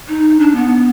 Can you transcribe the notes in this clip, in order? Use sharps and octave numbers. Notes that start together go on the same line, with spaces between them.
D#4
D4
B3